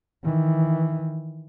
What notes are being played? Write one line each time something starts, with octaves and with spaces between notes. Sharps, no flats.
D#3 E3